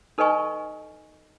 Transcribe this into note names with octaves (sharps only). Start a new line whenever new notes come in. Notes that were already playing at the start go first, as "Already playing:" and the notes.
D#4 A4 B4 D#5 G#5 C#6